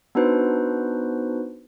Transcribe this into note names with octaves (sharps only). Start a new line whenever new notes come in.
B3 D4 D#4 F#4 B4 C5